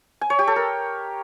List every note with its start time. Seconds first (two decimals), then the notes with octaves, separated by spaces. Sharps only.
0.21 G#5
0.30 C#5
0.39 G4
0.47 A4
0.56 A#4